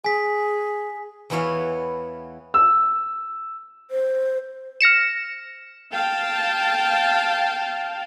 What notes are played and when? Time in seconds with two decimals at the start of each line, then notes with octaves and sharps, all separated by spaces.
0.04 G#4 G#5 B6
1.30 E2 E3 B3 E4 C#5 F5
2.54 E6
3.91 C5
4.81 F6 A#6 C#7 E7
5.92 F5 G5 A5